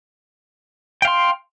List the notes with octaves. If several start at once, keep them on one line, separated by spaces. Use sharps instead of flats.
F5 G5 C6